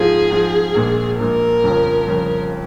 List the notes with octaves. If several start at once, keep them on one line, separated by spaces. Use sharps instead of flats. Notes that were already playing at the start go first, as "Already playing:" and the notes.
Already playing: G#2 F3 C4 F4 G#4
G#2 F3 C4 F4
A#1 A#2 G#3
A#1 A#2 G#3 A#4
G1 F2 C#3 F3
G1 F2 C#3 F3